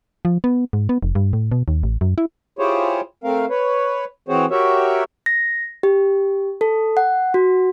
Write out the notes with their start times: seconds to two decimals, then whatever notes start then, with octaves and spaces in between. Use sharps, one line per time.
0.25 F3
0.44 B3
0.73 G#2
0.89 B3
1.03 F1
1.15 G2
1.33 A2
1.52 B2
1.68 D#2
1.83 A1
2.01 F#2
2.18 E4
2.59 E4 F4 G4 G#4 C5 C#5
3.24 A3 C4 A#4 F5
3.50 B4 C#5
4.29 E3 C4 F#4 G#4 C5 C#5
4.51 F#4 G4 A#4 C#5 E5
5.26 A#6
5.83 G4
6.61 A4
6.97 F#5
7.34 F#4